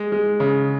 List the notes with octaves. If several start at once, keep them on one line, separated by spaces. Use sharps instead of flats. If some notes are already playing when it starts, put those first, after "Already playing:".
Already playing: G#3
G#3
C#3